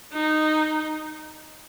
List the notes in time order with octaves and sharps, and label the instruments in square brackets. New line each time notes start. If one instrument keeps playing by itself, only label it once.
[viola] D#4